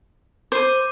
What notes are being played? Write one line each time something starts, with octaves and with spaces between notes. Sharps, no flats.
C5 D6 C7 D#7